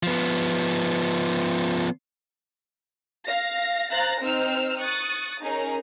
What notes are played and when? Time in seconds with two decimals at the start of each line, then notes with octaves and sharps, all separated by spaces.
0.03 F3 B3
3.27 F5 A#6
3.91 C5 F5 A#5 F#6 A6 A#6
4.21 C4 D#4 C5 E6 F6
4.80 C#6 D#6 F#6 A6
5.42 C#4 D#4 G#4 A#4 A#5